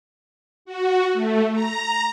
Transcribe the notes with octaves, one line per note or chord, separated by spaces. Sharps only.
F#4
A3
A#5